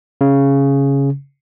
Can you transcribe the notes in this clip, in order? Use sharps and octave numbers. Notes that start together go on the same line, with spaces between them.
C#3